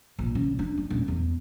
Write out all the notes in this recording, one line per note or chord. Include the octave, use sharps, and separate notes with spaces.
A#1
C#3
D4
D4
D#1
E2